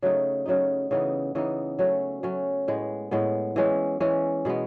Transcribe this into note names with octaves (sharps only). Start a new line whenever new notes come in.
C#3 F#3 A3 D#4
C#3 F#3 A3 D#4
C#3 E3 B3 D#4
C#3 E3 B3 D#4
F#3 A3 C#4
F#3 A3 C#4
A2 G#3 B3
A2 G#3 B3
E3 G#3 C#4
E3 G#3 C#4
B2 G#3 B3